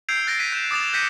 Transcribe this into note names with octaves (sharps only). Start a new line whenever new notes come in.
E6 G6 G#6 C7 D7 F7
F#6 A6 A#6 D7
G#6 B6 C7 D#7
F#6 G6 A#6 B6 E7 G7
D6 D#6 F#6 A6 E7 F7
F#6 G6 A#6 B6 C#7 D#7